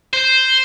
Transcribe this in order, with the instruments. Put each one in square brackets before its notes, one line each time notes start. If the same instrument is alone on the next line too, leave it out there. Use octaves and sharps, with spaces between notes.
[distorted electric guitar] C5